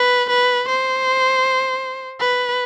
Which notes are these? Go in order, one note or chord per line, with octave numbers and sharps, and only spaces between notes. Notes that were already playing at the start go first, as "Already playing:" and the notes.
Already playing: B4
B4
C5
B4